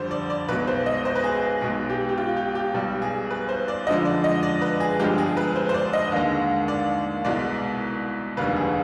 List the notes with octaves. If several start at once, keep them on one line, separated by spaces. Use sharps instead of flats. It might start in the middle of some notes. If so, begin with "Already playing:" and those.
Already playing: F2 D3 G3 C5
D5
D5
B1 B2 G#3 B4
C5
D#5
C5
B4
G#4
G#4
B1 B2 G#3 G#4
G4
G4
F4
G4
G4
B1 B2 G3
G#4
B4
C5
D5
F2 D3 F3 G#3 D#5
D5
D#5
D5
B4
G#4
G1 G2 F3 G#3 G4
G#4
B4
C5
C5
D5
D#5
D#2 D3 G#3
D5
C2 B2 G#3 D5
F1 D#2 D3 G3 B4
G#4